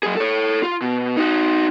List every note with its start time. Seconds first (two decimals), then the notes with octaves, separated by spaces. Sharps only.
0.03 F#3 G#4
0.17 A4 C#5
0.63 F4
0.82 B2
1.17 D#4 F#4